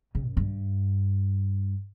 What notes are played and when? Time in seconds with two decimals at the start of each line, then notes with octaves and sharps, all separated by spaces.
0.15 C#3
0.27 F#2
0.37 G2